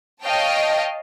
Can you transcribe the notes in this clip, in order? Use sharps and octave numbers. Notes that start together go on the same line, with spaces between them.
C#5 D#5 F5 G5 A5